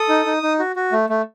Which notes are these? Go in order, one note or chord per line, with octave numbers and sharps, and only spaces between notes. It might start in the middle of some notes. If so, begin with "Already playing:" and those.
Already playing: A4 D#6
D#4
D#4
D#4
F#4
F#4
A3
A3